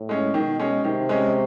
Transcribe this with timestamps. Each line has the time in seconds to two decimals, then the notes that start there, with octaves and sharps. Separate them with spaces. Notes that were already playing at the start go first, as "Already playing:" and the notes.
Already playing: A2
0.09 G#3 C#4
0.34 B2 D#3
0.60 G#3 C#4
0.84 C3 D#3
1.09 G#3 C#4